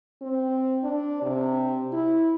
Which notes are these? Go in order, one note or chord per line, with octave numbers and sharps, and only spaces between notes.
C4
D4
C3
E4